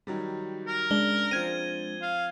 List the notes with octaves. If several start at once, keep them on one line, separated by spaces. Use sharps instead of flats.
D#3 F#3 G3
A#4
C#3 G#3 D4 G7
F3 C4 G#6 D#7
F5